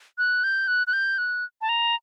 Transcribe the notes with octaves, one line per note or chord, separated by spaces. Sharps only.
F#6
G6
F#6
F#6
G6
F#6
A5
A#5